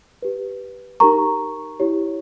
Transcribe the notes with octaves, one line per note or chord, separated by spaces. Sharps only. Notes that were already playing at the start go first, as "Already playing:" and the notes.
G4 B4
D#4 G4 A#4 A#5 C#6
E4 G4 C#5